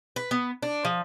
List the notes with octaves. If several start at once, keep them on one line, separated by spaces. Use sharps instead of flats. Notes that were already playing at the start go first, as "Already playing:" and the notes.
B4
B3
D4
F3